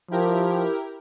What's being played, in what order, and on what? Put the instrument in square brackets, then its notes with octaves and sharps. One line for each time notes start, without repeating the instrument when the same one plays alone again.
[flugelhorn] F3 [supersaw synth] E4 G4 A#4